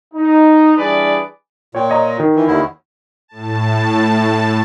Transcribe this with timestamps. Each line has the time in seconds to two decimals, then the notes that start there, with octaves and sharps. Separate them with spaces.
0.14 D#4
0.77 E3 G3 D4 G#4 B4 D5
1.75 A#2 C#5 G5
1.90 C#5 D#5 A#5
2.20 D#3
2.35 E3
2.47 D#2 D3 E4
3.28 A2 A5